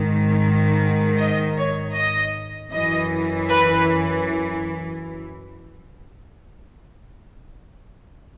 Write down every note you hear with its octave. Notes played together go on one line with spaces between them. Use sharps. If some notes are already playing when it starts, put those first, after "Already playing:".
Already playing: G#2 D#3
D#5
C#5
D#5
F#2 E3 D#5
B4